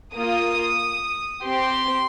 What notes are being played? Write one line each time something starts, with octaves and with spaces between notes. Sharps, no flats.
A#3 F4 D#6
C4 G4 C6